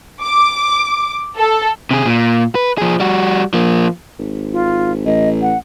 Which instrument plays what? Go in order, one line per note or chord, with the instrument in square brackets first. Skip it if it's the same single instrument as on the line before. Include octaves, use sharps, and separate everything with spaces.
[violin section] D6
A4
[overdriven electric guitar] C3 G#4
A#2
B4
F3 G#4
G3 F#4
F3 A#3
[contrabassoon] G#1
[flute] F4
[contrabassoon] A1 [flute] D#5
[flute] F#5